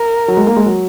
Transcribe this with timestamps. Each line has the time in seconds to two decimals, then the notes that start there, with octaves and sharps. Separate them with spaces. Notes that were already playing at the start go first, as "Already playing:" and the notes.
Already playing: A#4
0.28 F#3
0.37 G#3
0.47 A#3
0.57 G#3
0.66 F#3